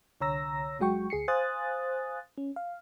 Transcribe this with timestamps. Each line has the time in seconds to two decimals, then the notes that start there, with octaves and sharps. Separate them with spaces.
0.21 C2 D3 C#5 A#5 E6 A#6
0.79 G1 F#3 G#3 F#4 G5 C#6
1.10 D2 G#4 C7 C#7
1.28 C5 F5 G#5 D#6 F#6 A6
2.38 C#4
2.56 F5